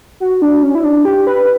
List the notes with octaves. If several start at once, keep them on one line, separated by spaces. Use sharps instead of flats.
F#4
D4
C#4
E4
D4
G4
B4